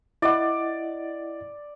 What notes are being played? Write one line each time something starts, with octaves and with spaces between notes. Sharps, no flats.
E4 D5 D#5 F#5